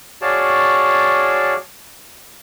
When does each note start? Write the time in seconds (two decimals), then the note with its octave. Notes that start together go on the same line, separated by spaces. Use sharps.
0.22 F#4 G#4 C#5 D5 F5 A5